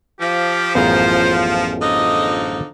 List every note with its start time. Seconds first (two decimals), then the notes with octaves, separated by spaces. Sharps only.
0.20 F3 G4
0.75 A1 F#2 B3 F4 G#4 C5 A#5
1.81 D3 F3 D#4 D#5